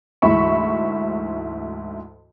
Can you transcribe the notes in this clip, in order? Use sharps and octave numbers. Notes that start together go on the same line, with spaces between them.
D2 G#2 E3 E5 B5 C#6